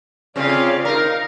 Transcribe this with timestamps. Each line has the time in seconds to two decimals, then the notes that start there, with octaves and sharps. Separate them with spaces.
0.36 C#3 C4 C#4 F4 D5 F5
0.85 D#4 A#4 F5